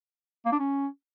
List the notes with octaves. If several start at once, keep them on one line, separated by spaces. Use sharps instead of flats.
A#3
D4
C#4